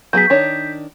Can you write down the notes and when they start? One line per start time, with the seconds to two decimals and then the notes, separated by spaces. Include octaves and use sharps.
0.13 F#3 B3 G#4 G6 B6
0.30 D#3 D4 C#5